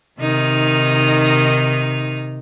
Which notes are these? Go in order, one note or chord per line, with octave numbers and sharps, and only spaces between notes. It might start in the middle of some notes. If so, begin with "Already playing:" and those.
C3 D#3 D#4